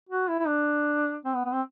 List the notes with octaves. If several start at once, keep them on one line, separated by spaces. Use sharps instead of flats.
F#4
E4
E4
D4
C4
B3
B3
C4